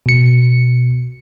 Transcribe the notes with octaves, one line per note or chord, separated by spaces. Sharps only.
B2 C#7